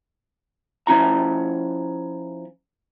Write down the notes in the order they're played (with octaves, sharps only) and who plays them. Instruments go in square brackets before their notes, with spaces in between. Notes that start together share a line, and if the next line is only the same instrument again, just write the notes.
[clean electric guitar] F3 C#4 E4 A#5